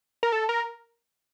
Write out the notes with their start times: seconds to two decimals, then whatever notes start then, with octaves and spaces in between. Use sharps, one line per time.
0.23 A#4
0.32 A4
0.49 A#4